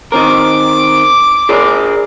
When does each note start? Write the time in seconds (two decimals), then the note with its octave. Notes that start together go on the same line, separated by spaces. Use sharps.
0.12 D#3 C4 A#4 D6
1.49 G#4 A#4 D5